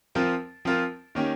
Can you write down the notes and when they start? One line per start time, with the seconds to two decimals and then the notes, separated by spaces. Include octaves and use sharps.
0.15 F3 C4 F4 A#4
0.65 F3 C4 F4 A#4
1.15 D#3 A#3 C#4 G4